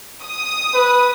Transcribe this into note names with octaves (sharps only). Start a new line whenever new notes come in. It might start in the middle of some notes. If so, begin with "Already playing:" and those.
D#6
B4